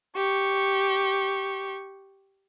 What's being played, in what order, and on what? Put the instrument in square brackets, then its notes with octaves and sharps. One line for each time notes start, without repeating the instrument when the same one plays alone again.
[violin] G4 C#6